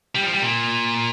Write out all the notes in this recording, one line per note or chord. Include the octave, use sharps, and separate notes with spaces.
G3
F3
G3
A#2